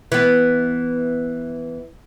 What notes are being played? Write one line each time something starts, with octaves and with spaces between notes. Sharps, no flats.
E3 B3